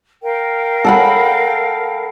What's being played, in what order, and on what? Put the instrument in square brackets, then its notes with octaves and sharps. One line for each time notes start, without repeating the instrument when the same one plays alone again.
[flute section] A#4 F5 G5
[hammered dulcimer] A4 F#5 B5